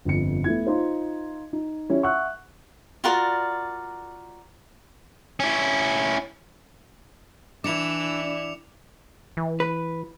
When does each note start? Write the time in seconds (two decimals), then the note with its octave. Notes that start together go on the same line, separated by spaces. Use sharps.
0.05 G1 F2 C#7
0.44 A3 B3 E4 G#6
0.67 D#4 F4 C5
1.53 D#4
1.89 G3 C#4 E4
2.02 E5 F#5 C#6 E6 F#6
3.04 F4 F#4 A#4 D5
5.40 C#4 E4
7.64 E3 D4 E4 D6 C#7 F7
9.37 E3
9.60 B4